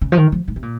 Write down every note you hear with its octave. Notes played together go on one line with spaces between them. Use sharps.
C#3
F3
D#3
F3
G#2
C3
A#2